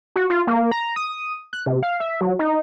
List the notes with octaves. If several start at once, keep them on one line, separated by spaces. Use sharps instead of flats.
F#4
F4
A#3
A#5
D#6
F#6
C3
F5
E5
F#3
D#4